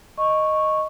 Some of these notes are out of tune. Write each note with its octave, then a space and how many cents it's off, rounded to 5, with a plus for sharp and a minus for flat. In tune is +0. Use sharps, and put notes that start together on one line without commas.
D#5 +0 C#6 -10